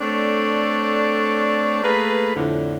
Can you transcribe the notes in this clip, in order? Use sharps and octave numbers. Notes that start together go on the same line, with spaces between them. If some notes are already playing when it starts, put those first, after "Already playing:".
A3 C4 D4 A4 C#5 D5
A3 A#3 G#4 A4 B4
F2 A2 D3